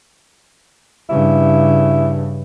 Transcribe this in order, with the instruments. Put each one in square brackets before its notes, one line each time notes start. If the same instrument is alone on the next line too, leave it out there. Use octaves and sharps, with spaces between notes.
[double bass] G2 C#3 [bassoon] E4